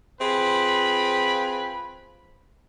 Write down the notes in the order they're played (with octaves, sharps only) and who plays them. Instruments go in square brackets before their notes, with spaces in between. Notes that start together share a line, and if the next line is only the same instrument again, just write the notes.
[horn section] C4 F4 G#4 B4 B5